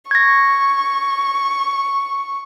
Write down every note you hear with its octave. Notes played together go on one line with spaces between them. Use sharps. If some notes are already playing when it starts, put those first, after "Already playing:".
C#6 G#6 A#6